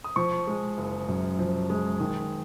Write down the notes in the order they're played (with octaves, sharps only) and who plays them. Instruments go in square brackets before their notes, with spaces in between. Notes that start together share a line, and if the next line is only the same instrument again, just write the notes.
[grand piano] D#6
F3 C#6
G#3
F#1
F#2
F3
G#3
D#3